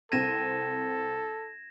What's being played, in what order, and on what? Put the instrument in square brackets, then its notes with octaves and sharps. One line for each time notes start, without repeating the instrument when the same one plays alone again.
[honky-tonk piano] C2 C4 D#7 [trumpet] A4 [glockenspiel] G#6 A#6 E7